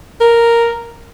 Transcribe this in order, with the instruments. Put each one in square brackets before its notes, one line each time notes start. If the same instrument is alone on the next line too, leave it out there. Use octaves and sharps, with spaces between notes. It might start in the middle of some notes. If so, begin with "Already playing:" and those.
[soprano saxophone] A#4